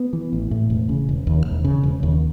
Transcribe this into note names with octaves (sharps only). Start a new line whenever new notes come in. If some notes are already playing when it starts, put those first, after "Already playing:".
Already playing: B3
E3
A1
A2
E1
C#3
E1
D#2
E1
C#3
E1
D#2